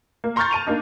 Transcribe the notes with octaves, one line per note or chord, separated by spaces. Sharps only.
A#3
A#5 C6 C#6 F6 G6 A6
A5 D#7 F7
A#3 D4 D#4